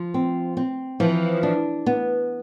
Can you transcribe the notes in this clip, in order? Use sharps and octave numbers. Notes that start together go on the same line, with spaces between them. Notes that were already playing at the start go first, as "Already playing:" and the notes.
Already playing: F3
C4
C4
E3 F3
D4
B3